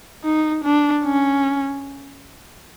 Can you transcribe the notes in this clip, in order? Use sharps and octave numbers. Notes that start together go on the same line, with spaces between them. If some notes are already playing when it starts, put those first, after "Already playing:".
D#4
D4
C#4